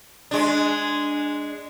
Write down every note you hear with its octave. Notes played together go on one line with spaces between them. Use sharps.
G#3 D4